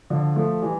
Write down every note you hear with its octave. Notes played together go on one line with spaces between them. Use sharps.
D3 F3
F3 A3
E3 G3